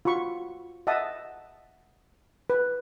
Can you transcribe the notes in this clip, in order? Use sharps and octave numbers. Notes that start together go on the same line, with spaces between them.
F4 F#4 B5 C#6
D#5 E5 F#5 A5 D#6
B4